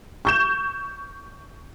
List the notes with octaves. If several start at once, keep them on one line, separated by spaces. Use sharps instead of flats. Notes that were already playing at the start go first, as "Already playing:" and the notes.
C#6 G6 E7